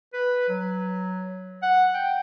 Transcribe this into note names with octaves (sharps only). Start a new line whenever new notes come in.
B4
F#3
F#5
G5